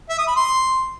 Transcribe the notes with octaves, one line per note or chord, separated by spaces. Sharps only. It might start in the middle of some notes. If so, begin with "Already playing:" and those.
E5
D#6
B5
C6